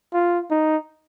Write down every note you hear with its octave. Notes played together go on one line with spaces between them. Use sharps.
F4
D#4